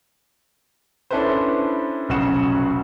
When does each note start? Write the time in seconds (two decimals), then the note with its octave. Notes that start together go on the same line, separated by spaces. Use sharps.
1.11 C#4 D4 E4 A4 B4 C5
2.09 F1 B1 C#3 F#4 F#5 E7